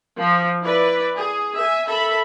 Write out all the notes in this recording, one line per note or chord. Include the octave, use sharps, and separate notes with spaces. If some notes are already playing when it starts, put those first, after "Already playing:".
F3
E4 B4 D5
G#4
E5 G#5
A4 E5 B5